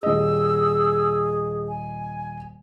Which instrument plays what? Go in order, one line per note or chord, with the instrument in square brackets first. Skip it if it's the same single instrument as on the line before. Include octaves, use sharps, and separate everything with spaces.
[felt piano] D#1 D#5 [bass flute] G#4 [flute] E6
[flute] G#5